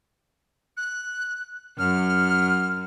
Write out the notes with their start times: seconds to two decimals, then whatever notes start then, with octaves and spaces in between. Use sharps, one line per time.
0.77 F#6
1.78 F#2 F6